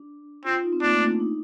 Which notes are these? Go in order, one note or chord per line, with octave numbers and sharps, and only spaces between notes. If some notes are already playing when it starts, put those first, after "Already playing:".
Already playing: D4
C4 F4
F4
D#4
C4
A#3 D4
A3
D4
D#4